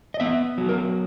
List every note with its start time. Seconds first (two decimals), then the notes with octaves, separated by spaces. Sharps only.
0.14 D#5
0.20 B3 E5
0.58 F#3
0.69 A#4